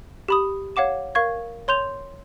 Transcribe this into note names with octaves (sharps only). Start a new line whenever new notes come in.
G4 B5 D#6
C#5 F5 F#5 D6 E7
A#4 F5 C#6 G#6
C#5 C6 G6 F7